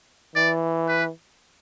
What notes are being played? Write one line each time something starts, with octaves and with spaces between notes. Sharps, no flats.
E3 D5
B4